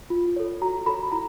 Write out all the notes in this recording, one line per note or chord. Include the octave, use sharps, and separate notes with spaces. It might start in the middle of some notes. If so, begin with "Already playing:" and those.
F4
A4 C#5
F#4 A#5
A4 C#5 B5
E4 A#5